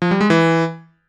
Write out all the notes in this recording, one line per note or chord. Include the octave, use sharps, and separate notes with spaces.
F3
G3
G#3
E3